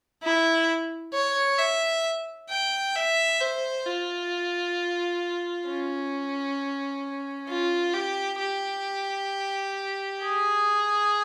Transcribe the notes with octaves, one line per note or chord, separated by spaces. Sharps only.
E4
C#5
E5
G5
E5
C5
F4
C#4
F4
G4
G4
G#4